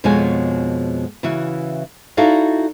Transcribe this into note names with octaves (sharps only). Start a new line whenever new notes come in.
F2 B2 G#3 F4 C#5 G#5
C#3 E3 E4 F#4
D#4 E4 F#4 A4 D5 F5